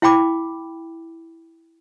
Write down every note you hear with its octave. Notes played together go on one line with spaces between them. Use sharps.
E4 F5 G5 B5 D6